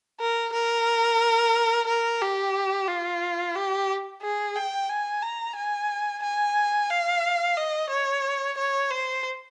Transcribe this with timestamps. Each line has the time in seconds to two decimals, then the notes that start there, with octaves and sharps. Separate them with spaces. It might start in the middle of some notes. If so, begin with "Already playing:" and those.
0.21 A#4
0.53 A#4
1.87 A#4
2.22 G4
2.88 F4
3.55 G4
4.22 G#4
4.56 G5
4.89 G#5
5.23 A#5
5.56 G#5
6.23 G#5
6.90 F5
7.57 D#5
7.90 C#5
8.58 C#5
8.91 C5